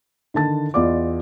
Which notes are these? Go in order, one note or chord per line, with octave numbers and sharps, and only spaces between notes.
D3 D#3 A5 A6
E2 F4 D5 D#5 D6